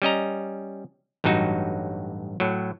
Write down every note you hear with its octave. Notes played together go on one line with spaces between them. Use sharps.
G3 C#4 D#5 A#5
A1 G2 F#3 D#4 F#4
A2 F#3